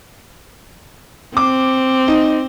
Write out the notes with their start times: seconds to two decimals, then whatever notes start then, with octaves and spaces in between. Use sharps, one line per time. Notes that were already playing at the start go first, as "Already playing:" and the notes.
1.37 C4 D6
2.08 D#4